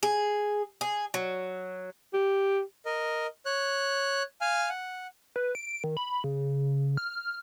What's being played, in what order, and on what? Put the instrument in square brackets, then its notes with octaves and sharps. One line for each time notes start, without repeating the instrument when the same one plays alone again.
[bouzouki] G#4
G#4
F#3
[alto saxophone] G4
[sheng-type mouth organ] A#4 D#5
C#5 F#6
F5 G#5 F6
F#5
[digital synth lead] B4
D7
D#3
B5
C#3
F6